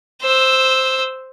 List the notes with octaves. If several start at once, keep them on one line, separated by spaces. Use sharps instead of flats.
C5 E6